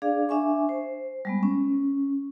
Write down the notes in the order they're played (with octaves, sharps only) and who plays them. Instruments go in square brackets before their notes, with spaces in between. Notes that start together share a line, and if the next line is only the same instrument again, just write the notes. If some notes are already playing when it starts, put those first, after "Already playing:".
[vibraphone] D4 G#4 D5 F5
D4 E5 G#5 C#6
C5
G3 G#3 B3
C#4